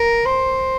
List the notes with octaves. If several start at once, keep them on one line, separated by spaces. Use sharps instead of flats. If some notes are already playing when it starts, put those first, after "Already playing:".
Already playing: A#4
C5